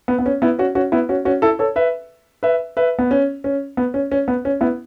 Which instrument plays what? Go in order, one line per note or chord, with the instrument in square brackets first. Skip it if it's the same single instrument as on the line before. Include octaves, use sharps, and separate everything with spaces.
[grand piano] B3
B3
C#4
B3 E4
C#4 F#4
C#4 F#4
B3 E4
C#4 F#4
C#4 F#4
E4 A4
A4 C#5
B4 E5
B4 E5
B4 E5
B3
C#4
C#4
B3
C#4
C#4
B3
C#4
B3 E4